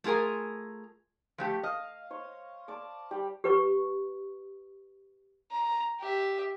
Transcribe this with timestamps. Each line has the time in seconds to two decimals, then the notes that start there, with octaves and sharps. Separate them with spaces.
0.04 A3 F4 G#4 A#4 G#5
1.38 F3 A3 G4
1.63 D#5 F5
2.10 C5 C#5
2.68 D5 A5 D6
3.11 G3 G4 D5
3.44 G4 B4 C#6
5.51 A#5
6.00 G4 E5